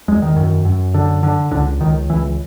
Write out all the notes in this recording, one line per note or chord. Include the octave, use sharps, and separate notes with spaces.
E2 G#3
D#3
F#2
F#2
D3
D3
C#2 D3
C#2 D#3
C#2 E3